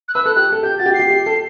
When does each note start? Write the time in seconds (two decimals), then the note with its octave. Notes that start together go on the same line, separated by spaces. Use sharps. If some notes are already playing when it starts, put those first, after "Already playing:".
0.08 F#6
0.14 B4 E6
0.25 A4 F#6
0.36 G4 F#6
0.52 A4
0.63 G4 G6
0.78 F#4 A6
0.86 G4
0.90 F#4
0.94 C7
0.99 G4
1.10 G4
1.26 A4